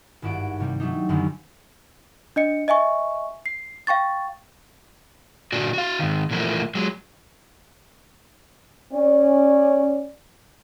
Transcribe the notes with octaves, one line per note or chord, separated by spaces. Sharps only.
G#1 G2 E4 F#4 D7
C3 G3
F#3 A3 D4 D#4
F#2 D3 D#3 G3 G#3 B3
D4 D#5 C#7
D#5 E5 G#5 C#6
C7
F5 G5 C#6 A6
A#2 D3 F#4 D5
F#4 F5
G#2 D#3
A#2 E3 F3 G3 A3 A#3
F#3 G#3
C#4 D5